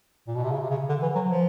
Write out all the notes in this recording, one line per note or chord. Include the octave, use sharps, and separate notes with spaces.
A#2
B2
C3
C#3
C3
C#3
D3
E3
F#3
F3